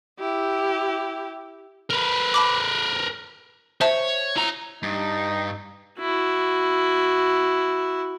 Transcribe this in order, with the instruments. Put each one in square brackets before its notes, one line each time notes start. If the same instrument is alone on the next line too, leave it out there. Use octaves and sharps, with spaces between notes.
[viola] E4 G4
[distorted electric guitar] A#4 B4
[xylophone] A5 B5 D6
[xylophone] C5 E5 A5 [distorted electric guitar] C#5
[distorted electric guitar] E4 A#5
[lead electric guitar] G2 [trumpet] D#4
[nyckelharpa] E4 F#4